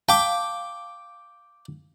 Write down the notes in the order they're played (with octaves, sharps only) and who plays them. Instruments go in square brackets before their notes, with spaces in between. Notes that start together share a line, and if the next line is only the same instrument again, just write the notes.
[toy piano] F5 A5 [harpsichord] G5 D6